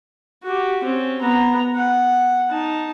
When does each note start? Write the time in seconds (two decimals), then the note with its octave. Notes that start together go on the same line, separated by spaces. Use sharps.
0.43 F#4 G4
0.84 C4 C#4
1.21 B3 A#5
1.76 F#5
2.50 D#4 A5